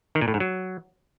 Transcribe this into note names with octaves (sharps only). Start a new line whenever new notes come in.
D#3
A#2
A2
G#2
F#3